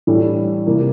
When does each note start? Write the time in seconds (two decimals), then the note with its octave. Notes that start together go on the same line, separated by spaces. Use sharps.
0.07 A2 E3 G3 D4 A4
0.66 C3 E3 G3 A#3